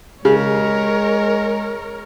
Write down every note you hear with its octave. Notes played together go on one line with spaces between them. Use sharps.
C#3 G#3 A#4 C#5